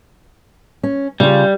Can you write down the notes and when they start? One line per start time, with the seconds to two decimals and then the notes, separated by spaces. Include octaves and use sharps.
0.83 C#4
1.20 C#3 G3 F4